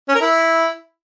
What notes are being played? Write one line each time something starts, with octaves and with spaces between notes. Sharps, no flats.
C#4
A#4
E4